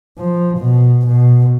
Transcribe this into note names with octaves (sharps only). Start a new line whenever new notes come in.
F3
B2
B2